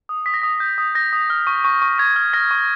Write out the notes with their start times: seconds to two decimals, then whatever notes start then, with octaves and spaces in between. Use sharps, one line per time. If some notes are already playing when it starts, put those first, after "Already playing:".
0.09 D#6
0.26 D#6 B6
0.34 A#6
0.42 D#6 B6
0.60 G6
0.78 D#6
0.95 G6 A#6
1.13 D#6
1.30 F6
1.47 C#6
1.65 C#6
1.82 C#6
1.98 C#6 G#6
2.16 F6
2.33 F6 A#6
2.51 C#6